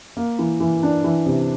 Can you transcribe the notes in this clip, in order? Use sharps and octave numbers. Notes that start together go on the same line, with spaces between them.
A#3
E3
E3
D4
E3
C3